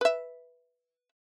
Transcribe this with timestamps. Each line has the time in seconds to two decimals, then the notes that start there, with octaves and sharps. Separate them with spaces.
0.01 B4 E5